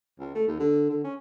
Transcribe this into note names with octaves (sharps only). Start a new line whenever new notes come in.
C#2
A3
D#2
D3
D3
C#4